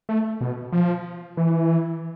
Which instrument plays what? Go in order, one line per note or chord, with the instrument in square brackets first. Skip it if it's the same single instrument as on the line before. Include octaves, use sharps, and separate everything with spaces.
[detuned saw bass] A3
B2
F3
E3